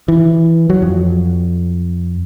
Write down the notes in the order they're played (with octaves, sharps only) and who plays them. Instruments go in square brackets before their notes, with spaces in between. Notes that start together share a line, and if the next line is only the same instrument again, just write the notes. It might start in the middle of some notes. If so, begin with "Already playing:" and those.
[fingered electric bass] E3
F#3
F2